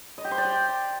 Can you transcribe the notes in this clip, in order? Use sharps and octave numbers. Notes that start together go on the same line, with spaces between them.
D#5
G4
C5
D5
G4